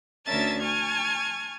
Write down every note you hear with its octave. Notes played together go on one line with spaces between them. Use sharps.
D2 C#4 A#4 E5 A5 A6
G#5 A5 C#6 F6 G#6